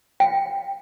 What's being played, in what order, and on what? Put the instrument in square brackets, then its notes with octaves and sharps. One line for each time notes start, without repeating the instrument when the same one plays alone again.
[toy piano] G5